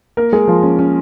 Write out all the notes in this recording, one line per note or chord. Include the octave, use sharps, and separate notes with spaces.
A#3 A#4
G#3 G#4
F3 F4
C#4
C#4